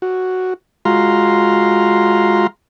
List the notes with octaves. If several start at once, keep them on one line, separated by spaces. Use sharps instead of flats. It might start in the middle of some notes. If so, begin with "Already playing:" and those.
F#4
G#3 F4 F#4 F5 A#5 C6